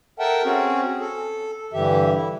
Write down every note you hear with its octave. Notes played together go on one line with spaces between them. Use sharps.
A4 A#4 E5 F#5 G5 A5
C4 C#4 F#4 G#4
A4
G2 D3 E3 G4 E5
E4